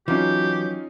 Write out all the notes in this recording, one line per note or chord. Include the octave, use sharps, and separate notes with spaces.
E3 F#3 C#4 D#4 F4 G4